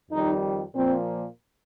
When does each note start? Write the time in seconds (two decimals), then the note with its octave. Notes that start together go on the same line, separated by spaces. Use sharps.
0.11 F2 D#3 G3 D#4
0.74 A#2 F3 A#3 C4